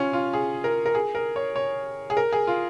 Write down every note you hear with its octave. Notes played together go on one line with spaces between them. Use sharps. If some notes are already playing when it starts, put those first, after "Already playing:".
Already playing: C#4 F4
F4
G#4
A#4
A#4
G#4
A#4
C#5
C#5
G#4
A#4
G#4
F4